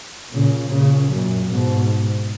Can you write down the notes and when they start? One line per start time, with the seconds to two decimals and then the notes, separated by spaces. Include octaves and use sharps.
0.31 A#2 C#3
0.70 A#2 C#3
1.09 F#2 A#2
1.48 G#2 B2